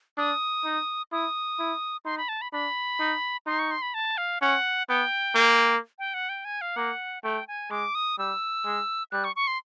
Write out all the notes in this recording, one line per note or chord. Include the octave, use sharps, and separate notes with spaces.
D4 D#6
D#4
E4 D#6
E4
D#4 C6
B5
A5
B5
D4 B5
D#4
D#4 C6
C#6
C6
B5
A5
F5
C#4 F#5
B3 G5
A#3
G5
F#5
G5
G#5
F5
A#3 F#5
A3 G5
G#5
G#3 D6
D#6
G3 E6
G#3
G3 F#6
C#6
C#6
C6